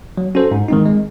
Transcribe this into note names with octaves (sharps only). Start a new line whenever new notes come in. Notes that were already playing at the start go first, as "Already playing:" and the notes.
F#3
C#4 F#4 A4 C5
G#2
D#3 G#3 C4 D#4
G#3